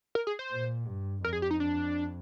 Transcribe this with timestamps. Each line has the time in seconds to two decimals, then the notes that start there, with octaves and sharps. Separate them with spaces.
0.15 A#4
0.27 G#4
0.39 C5
0.52 A#2
0.87 G2
1.24 F2 A#4
1.33 G#4
1.42 G4
1.51 D#4
1.60 D4